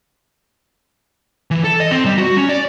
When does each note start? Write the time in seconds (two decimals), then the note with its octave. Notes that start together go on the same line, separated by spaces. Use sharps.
1.51 E3
1.64 A4
1.80 D#5
1.92 C4
2.06 G3
2.18 F#4
2.37 C#4
2.49 D5